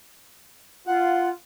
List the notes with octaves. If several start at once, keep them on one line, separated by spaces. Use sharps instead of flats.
F4 F#5